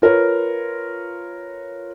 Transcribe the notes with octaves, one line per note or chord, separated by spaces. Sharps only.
F4 A#4 B4 C#5